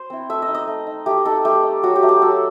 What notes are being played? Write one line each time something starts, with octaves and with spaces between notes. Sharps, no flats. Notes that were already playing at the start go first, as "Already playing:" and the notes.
Already playing: C5
C4 E4
A3 E5
D#5
D#4
D#5
A3
D#4
A3 G4
D#4 A4
A3 G4
D#4
F#3 F#4
G4
A3 D#4
G4
F#3 A4